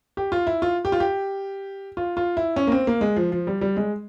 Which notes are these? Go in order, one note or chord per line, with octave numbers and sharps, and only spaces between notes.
G4
F4
E4
F4
G4
F4
G4
F4
F4
E4
C#4
A#3
C4
A#3
G#3
F3
F3
G3
G3
G#3